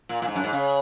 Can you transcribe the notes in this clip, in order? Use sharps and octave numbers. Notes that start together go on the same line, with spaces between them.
A#2
A#2
G#2
F#2
G#2
C#3